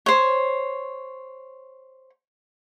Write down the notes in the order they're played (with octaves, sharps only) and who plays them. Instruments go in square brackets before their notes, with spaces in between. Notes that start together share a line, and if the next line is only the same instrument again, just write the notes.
[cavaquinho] C5 C#5